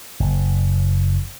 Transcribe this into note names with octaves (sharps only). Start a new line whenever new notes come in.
F#1